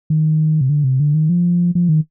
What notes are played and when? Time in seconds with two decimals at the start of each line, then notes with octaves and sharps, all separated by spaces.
0.10 D#3
0.61 C3
0.69 D3
0.84 C3
1.00 D3
1.14 D#3
1.29 F3
1.75 F3
1.89 D#3